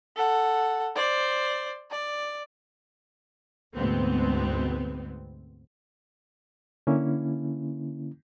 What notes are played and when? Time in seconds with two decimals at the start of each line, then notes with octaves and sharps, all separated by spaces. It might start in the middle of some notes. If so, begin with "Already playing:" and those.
0.16 A4 F#5
0.95 C5 D5
1.90 D5
3.75 D2 G#2 B2 B3 C4
6.87 D3 A#3 C#4 E4